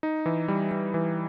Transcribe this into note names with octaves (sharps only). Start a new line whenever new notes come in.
D#4
E3
G3
G3
E3